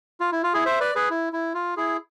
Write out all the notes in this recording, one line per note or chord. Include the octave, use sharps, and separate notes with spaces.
F4
E4
F4
E4 G#4
C5 E5
B4 D5
G#4 B4
E4
E4
F4
E4 G#4